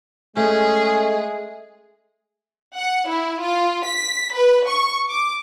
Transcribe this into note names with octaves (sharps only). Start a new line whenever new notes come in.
G#3 A3 C#4 G#4
F#5
E4
F4
B6
B4
C#6
D6